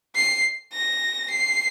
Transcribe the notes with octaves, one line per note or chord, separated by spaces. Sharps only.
C7
A#6
C7